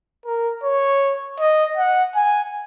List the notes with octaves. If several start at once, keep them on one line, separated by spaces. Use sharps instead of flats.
A#4
C#5
D#5
F#5
G#5